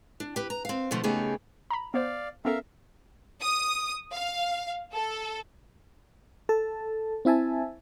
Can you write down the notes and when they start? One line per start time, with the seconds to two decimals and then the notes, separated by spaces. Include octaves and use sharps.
0.20 D4
0.36 G4 B4
0.50 A#5
0.65 C4 F5
0.91 B2 D3 F3 A3 F4
1.04 C#3 A3 B3 D#4 G4 G#4
1.70 A#5 B5
1.94 B3 C5 D5 F5
2.45 B3 C#4 A4 A#4 E5 F5
3.42 D#6
4.12 F5
4.93 A4
6.49 A4 A5
7.25 C4 E4 E5 G#5 A5